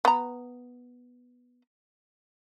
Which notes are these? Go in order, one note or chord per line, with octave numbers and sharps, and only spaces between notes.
B3 A#5